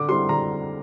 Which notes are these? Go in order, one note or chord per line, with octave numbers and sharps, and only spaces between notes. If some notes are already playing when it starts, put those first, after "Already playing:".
Already playing: D3 D6
G3 C4 E4 C6
D3 A#5